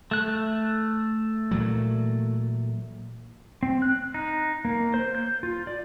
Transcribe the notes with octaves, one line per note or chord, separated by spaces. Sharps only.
A3 F#6
A#2 E3 F#3
C4
F#6
D#4
A#3
C5
G6
F4
D5